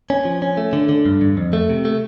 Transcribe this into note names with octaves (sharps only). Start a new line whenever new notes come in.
C#4
F3
C#4
A3
D3
D3
G2
G2
F2
A3
C3
A3